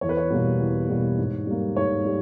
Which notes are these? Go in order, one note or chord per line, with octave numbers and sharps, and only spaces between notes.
E2 C#5
B4
C#5
B2 G3 A#3
E2
B2 G3 A#3
G#2
G3 A#3
G#2 C#5
G3